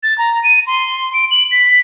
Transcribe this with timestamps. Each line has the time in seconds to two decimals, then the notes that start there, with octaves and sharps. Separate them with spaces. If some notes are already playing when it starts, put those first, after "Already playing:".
0.03 A6
0.18 A#5
0.44 D#7
0.67 C6
1.14 D7
1.31 F#7
1.51 B6